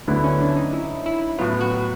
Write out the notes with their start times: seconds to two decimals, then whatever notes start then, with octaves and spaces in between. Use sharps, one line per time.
0.07 D2 D3 F#3 A3 B3 E4
0.24 C#4
0.41 D4
0.57 D#4
0.73 E4
1.06 E4
1.38 A2 F#3 B3 F4
1.61 F#4